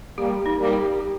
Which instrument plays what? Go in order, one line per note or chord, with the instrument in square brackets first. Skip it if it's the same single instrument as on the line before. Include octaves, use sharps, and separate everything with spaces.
[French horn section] G3 A#3 [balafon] G4
[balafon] D#4
[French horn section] G3 A#3
[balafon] G4
G4